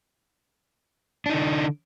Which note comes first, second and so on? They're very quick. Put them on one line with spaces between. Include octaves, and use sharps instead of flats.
D4 D#4 D3